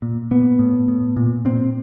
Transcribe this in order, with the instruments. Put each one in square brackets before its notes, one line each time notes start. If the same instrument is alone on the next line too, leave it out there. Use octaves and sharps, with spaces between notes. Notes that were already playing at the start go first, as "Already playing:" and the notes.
[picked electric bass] A#2
A#2 B3
A2
A2
A#2
A#2 C4